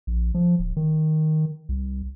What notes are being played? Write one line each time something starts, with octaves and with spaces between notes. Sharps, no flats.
A#1
F3
D1
D#3
C2